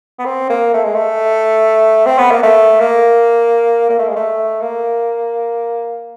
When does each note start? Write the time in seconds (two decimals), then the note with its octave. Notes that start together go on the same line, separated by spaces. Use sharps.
0.19 B3
0.25 C4
0.50 A#3
0.74 A3
0.84 G#3
0.94 A3
2.06 C4
2.18 B3
2.31 A#3
2.43 A3
2.80 A#3
3.89 A#3
3.99 A3
4.08 G#3
4.16 A3
4.61 A#3